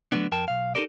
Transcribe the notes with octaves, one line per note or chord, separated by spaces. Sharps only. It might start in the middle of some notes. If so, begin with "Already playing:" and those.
D3 F#3 G3 A3 B3 D4
F2 A#4 G5 A5
B1 F5
D#4 E4 G4 A4 A#4 D5